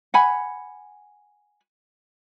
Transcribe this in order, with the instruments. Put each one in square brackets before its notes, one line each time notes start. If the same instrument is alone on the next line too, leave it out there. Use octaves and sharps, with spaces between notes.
[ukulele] F#5 G#5 B5